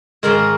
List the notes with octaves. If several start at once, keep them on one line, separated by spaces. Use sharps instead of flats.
G#2 D#3 G#3 A#4